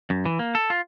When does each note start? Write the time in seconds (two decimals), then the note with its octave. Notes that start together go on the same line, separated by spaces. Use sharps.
0.10 F#2
0.25 E3
0.39 A#3
0.55 A4
0.70 F4